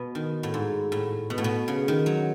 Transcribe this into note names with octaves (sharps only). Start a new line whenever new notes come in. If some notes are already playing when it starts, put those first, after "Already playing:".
Already playing: B2
D#3
A2
G#2
A2
B2
A2
B2
C#3
D#3
F#3